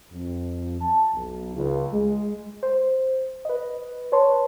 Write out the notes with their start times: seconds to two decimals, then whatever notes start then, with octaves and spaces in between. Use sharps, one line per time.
0.13 F2
0.81 A5
1.14 B1
1.55 C#2
1.93 G#3
2.63 C5
3.45 B4 D#5
4.12 B4 C#5 A5 C6